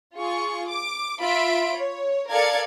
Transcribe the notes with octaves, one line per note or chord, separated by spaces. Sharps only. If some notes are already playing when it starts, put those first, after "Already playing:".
F4 G#4 C#6
D6
F4 E5 B5 D7
C#5
A4 A#4 D5 F5 G#6 C#7